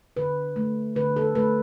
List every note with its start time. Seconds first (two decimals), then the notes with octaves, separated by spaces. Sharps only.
0.17 D3 B4
0.56 A3
0.96 D3 B4
1.16 A4
1.35 A3 B4